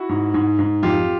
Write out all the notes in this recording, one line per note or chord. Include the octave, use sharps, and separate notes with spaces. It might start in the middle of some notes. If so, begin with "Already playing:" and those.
Already playing: E4 F#4
G#2
G#2
G#2
F2 F4 G4